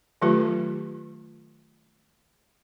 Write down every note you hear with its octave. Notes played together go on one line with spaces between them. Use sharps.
D#3 F#3 A3 F4 G4 B4